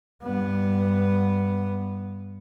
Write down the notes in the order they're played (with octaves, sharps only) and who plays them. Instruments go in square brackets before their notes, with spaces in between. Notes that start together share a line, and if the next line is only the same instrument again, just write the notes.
[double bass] G2 B3